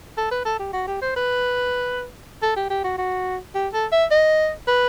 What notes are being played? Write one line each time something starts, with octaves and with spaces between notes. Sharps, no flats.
A4
B4
A4
G4
F#4
G4
C5
B4
A4
G4
G4
F#4
F#4
G4
A4
E5
D#5
B4